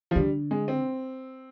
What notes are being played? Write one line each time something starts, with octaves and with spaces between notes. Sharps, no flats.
F3
D3 G3
G#3
C4